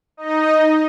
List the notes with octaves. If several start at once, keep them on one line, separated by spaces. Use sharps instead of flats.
D#4 D#5